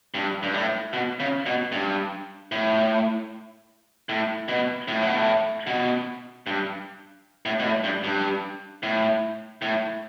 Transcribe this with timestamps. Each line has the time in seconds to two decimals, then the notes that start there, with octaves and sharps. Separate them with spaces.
0.14 G2
0.43 G2
0.54 A2
0.93 B2
1.20 C#3
1.46 B2
1.72 G2
2.52 A2
4.09 A2
4.48 B2
4.88 A2
5.02 B2
5.16 A2
5.67 B2
6.47 G2
7.46 A2
7.60 B2
7.65 A2
7.84 G2
8.04 G2
8.83 A2
9.62 A2